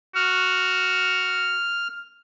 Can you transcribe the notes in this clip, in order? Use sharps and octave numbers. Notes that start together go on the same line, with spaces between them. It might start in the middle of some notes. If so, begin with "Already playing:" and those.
F#4 F6